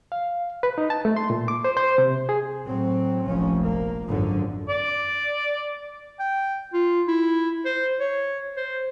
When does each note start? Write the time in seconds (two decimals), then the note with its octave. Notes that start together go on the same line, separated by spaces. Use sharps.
0.12 F5
0.63 B4
0.78 D#4
0.90 A5
1.05 A3
1.17 C6
1.30 A#2
1.48 D6
1.64 C5
1.77 C5
1.98 C3
2.29 G#4
2.65 A2 F#3 C4
3.28 F1 A#1 F3 C#4
3.63 A#3
4.08 G#1 F#2 D3 F3
4.69 D5
6.20 G5
6.73 F4
7.08 E4
7.65 C5
8.00 C#5
8.57 C5